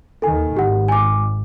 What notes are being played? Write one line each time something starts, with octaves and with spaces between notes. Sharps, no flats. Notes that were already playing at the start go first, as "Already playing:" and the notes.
D#2 D#3 A4 G#5
G#1 G4 F#5
G#5 D6